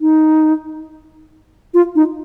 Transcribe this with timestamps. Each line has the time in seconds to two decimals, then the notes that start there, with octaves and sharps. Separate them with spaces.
0.01 D#4
1.74 F4
1.96 D#4